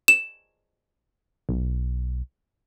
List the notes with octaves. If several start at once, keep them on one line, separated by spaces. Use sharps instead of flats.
E7
B1